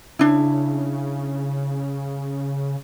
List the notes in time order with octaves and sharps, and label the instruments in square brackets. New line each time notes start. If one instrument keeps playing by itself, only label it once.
[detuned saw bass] C#3 [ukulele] D4 E4